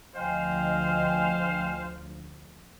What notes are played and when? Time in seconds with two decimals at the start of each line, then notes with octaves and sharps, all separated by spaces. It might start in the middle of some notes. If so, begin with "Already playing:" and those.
0.16 D2 F3 C5 D#5 F5 G5 G#5